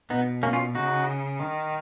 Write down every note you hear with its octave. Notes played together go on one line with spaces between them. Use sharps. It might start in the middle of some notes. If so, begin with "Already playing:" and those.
B2 B3 D#4
A#3 C#4
C#4 F4
C#3 D#4 F#4
D#3